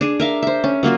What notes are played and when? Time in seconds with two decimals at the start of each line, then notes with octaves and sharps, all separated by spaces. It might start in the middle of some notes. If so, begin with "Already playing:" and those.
0.01 D4 G#4
0.20 A#4 E5 F5
0.43 C5 E5
0.64 C#4
0.83 F#3 A#3 F4 F#4